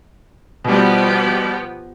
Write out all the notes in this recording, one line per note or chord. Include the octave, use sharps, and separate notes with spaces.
B2 F3 G3 B3 G4